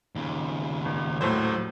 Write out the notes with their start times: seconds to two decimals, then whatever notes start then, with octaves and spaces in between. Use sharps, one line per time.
0.16 D#2 C#3
0.85 G#1
1.21 D#1 A2 F#3 C5